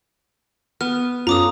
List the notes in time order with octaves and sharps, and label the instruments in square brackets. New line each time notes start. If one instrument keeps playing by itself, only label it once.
[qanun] B3 [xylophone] F6
[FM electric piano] F#2 C#4 A4 [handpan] F4 [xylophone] A#5 D6 D#6